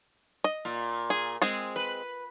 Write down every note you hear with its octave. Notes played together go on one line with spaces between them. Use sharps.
D#5
A#2
G#4
G#3 C4 G#4
B4